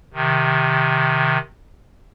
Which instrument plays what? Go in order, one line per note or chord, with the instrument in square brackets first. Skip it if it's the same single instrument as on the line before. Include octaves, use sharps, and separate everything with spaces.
[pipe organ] C3 D#3